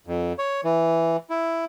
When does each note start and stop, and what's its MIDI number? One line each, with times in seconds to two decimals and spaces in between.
0.07 0.33 41
0.39 0.61 73
0.64 1.17 52
1.30 1.65 64